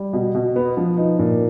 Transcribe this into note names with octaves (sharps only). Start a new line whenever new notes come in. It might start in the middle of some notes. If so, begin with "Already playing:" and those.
Already playing: G3
B2
B2
B3
F3
D#4
A#2